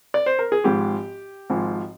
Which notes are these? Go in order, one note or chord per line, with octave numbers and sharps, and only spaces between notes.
D5
C5
A#4
G#4
G#1 G#2 F3 G4
G#1 G#2 F3